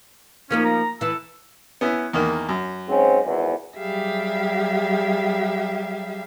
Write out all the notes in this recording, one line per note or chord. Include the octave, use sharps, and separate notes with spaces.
F3 A#3 C#4 D#4
A#5
E3 E4 A4
B3 C#4 E4
E2 D#3 A#3
F#2
G#2 C4 C#4
G#1 E2
F#3 G3 G4 G#4 E5 F5